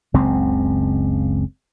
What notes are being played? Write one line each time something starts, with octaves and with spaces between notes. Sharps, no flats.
F#1 C#2 C#3 C4